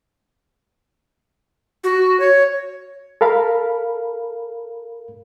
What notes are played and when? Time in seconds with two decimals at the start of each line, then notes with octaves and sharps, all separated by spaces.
1.84 F#4
2.20 C#5
3.21 A4 A#4 F5 B5